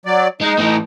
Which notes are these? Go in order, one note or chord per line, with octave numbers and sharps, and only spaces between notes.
F#3 D5
G#3 D#4
A2 E3